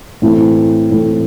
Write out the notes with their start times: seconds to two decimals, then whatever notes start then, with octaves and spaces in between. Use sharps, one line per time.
0.22 A2 E3 A3 C4
0.90 A2 E3 A3 C4